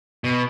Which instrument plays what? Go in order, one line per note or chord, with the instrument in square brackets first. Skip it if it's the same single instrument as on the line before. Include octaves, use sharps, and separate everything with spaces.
[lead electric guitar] B2